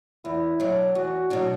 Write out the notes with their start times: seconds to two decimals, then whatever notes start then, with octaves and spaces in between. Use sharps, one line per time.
0.25 E2 E4
0.60 B2 F#3 D4
0.95 E2 F#4
1.30 B2 F#3 D4